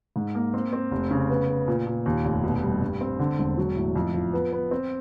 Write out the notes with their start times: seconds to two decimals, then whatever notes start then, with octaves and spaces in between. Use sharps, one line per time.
0.16 G#2
0.35 A#3
0.54 C4
0.73 C4
0.92 F1
1.11 C#3
1.30 B3
1.48 B3
1.68 A#2
1.86 A#2
2.06 D#2
2.24 F1
2.44 B2
2.63 G3
2.81 G2
3.01 C4
3.19 D3
3.39 E1
3.57 F#3
3.77 A2
3.96 F2
4.14 F3
4.33 B3
4.53 B3
4.71 C4